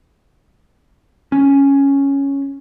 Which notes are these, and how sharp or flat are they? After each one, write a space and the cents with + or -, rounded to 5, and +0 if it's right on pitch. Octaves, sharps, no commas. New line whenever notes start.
C#4 +0